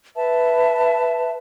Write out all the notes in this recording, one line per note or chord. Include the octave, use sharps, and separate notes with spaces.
B4 E5 A5